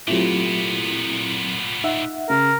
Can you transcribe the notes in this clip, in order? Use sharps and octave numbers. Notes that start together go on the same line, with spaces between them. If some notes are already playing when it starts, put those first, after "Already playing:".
A#2 F#3 A3 B3 C4 E4 F4 G4
D#4 E5 F#5
C#3 A#4